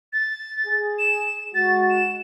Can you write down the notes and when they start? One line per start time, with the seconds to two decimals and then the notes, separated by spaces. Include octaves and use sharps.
0.13 A6
0.66 G#4
0.99 E7
1.55 G#3 F#4 A6
1.90 E7